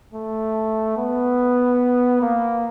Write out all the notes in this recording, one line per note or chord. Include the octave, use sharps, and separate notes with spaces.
A3
B3
A#3